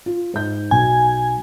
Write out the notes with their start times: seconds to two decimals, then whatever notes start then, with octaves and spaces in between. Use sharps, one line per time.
0.06 F4
0.34 G#2 G6
0.71 B1 G#5